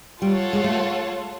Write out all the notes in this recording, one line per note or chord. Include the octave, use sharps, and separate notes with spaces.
G3 F4 A4 C#5 F#5 A5
G#3
A3